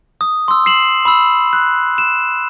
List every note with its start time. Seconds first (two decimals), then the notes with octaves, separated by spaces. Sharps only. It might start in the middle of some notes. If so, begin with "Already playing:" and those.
0.21 D#6
0.48 C6 E6
0.66 C7 E7 F#7
1.05 B5 E6
1.53 F#6
1.98 E7